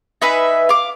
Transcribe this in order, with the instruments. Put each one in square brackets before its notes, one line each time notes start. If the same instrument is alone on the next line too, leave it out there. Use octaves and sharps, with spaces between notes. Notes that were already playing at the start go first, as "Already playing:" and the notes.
[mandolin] D#4 B4 E5 G#5
F5 D6